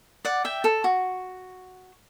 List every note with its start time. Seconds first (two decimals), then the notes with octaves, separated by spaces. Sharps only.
0.25 D5 F#5
0.45 E5 G5
0.64 A4
0.84 F#4